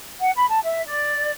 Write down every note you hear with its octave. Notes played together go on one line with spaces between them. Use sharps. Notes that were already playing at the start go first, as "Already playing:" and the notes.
F#5
B5
A5
E5
D5